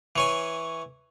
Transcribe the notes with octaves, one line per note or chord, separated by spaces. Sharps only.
E3 C#5 G#5